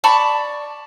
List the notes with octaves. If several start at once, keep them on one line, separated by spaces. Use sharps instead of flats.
D5 A5 B5 C#6